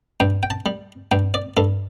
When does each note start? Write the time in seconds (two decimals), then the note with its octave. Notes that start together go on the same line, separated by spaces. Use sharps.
0.20 G2 G5
0.43 G5
0.50 A5
0.66 G3
1.11 G2 G5
1.34 D5
1.57 G2 A4